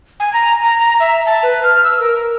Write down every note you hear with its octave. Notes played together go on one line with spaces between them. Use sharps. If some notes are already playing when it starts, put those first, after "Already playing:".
G#5
A#5
A#5
A#5
E5
A5
B4
F6
E6
A#4